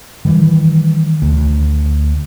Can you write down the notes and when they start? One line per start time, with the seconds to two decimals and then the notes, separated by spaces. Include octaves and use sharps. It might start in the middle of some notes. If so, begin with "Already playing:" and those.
0.25 D#3 E3 G3
1.22 D2